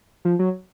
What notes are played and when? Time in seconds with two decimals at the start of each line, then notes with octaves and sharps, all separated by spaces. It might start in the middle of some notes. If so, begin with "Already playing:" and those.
0.25 F3
0.39 F#3